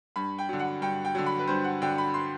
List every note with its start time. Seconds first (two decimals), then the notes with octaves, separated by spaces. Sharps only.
0.16 G2 B5
0.39 G5
0.49 D3 F#3
0.59 F#5
0.82 G2 G5
1.05 G5
1.15 D3 F#3
1.26 B5
1.39 B4
1.47 G2 C5
1.64 F#5
1.82 D3 F#3 G5
1.98 B5
2.14 C6